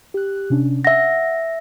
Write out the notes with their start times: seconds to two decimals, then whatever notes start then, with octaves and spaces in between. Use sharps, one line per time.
0.14 G4 F#6
0.50 C3 C#4 D4
0.85 E5 F#5 A#6